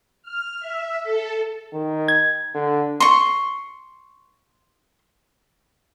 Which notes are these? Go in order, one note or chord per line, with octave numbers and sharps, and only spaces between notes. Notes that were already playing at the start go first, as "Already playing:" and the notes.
F6
E5
A4
D#3
G#6
D3
C6 C#6